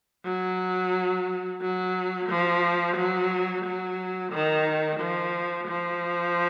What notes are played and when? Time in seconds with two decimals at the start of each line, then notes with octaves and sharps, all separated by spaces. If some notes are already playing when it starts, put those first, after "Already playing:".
0.25 F#3
1.61 F#3
2.29 F3
2.96 F#3
3.65 F#3
4.32 D#3
4.99 F3
5.67 F3